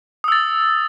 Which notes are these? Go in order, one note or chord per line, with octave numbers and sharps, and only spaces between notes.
D#6 E6 A6